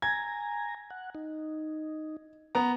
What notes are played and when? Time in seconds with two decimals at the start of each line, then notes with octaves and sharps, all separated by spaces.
0.02 G#5 A#5 G#6
0.90 F#5
1.15 D#4
2.55 B3 A#5